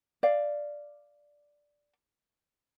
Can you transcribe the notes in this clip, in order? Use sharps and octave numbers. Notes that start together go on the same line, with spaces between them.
D5 F5